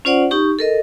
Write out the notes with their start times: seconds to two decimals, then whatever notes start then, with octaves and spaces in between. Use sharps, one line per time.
0.05 C#4 F4 C5 D5 F#5
0.31 D#4 G4 C#6
0.59 A4 A#4 D#5